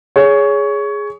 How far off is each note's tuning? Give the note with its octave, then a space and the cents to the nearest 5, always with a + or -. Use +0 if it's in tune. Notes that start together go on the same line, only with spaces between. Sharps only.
G#4 +0 C#5 +15